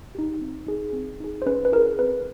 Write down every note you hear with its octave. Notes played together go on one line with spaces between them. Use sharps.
D#4 G4
C4
D#4 G#4
C4
D#4 G#4
C5
C#4 B4
B4
E4 G#4 A#4
C4 B4